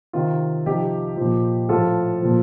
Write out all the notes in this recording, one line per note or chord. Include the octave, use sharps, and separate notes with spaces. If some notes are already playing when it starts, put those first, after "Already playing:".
C3 D#3 F4
C3 F3 D#4 G4
A#2 F3
A2 F3 F4 A4
A#2 F3